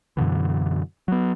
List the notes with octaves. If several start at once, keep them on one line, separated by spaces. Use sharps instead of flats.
F#2 B2 D3 E3
F#3 B3